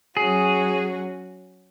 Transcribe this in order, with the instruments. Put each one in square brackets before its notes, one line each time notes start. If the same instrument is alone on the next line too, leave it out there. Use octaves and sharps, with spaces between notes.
[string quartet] F#3 C#4 F#4 [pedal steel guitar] G#4